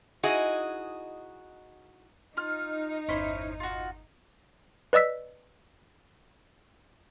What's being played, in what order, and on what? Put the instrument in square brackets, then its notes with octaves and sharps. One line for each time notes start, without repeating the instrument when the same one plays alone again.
[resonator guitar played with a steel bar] D#4 E4 F#4 G#4 D#5
[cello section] D#4 [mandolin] F4 F6
[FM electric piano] G1 E2 [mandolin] C#4 E4 C5
[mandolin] F4 F#4
[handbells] B4 D5 D#5 E6 B6